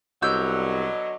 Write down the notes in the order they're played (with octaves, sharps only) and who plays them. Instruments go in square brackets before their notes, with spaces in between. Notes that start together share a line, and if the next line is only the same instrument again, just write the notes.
[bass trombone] C2 [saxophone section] B2 D3 F#3 [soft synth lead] D#5 [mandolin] E6 G6